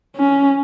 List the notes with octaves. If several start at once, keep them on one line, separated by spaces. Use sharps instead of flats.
C#4